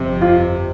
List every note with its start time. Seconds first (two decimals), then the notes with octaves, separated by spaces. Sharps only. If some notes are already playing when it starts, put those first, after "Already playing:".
Already playing: G1 F2 C3
0.21 F4